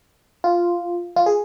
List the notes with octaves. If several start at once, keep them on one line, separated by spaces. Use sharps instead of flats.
F4
F4
G#4